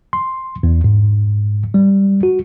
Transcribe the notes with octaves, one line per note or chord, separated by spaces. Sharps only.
C6
E2
G#2
G3
F#4